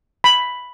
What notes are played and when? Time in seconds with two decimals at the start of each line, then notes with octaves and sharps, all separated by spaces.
0.24 B5